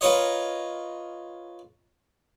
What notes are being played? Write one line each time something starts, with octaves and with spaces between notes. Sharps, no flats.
F4 A#4 B4 C#5 D#5